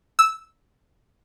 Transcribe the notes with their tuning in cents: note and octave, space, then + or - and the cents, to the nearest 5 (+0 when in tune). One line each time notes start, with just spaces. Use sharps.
E6 -10